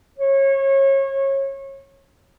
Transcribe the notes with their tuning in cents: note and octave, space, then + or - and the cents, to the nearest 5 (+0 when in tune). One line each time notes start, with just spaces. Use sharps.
C#5 -30